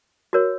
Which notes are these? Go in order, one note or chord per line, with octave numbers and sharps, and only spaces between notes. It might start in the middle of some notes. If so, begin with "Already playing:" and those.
F#4 A#4 C#5